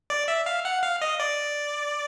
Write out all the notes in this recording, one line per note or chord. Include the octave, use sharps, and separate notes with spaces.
D5
E5
F5
F#5
F5
D#5
D5